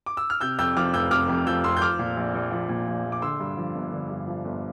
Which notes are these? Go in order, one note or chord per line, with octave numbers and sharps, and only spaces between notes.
D6
E6
F6
C3 E6 G6
F2 E6 G6
F3 D6 F6
F1 E6 G6
C3 D6 F6
F2
F3 E6 G6
F1 C6 E6
G6
F3 D6 F6
A#2
A#1
A#1
F3
A#2
A#1
A#1
D6
D3 C6 E6
G2
F3
G1
D3
G2
F3
G1